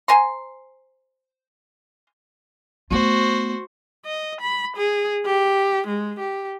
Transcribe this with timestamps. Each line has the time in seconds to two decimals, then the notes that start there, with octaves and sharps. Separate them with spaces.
0.08 C5 G#5 A#5 C6
2.91 A3 B3 F#4 C5
4.06 D#5
4.41 B5
4.77 G#4
5.25 G4
5.88 G#3
6.19 G4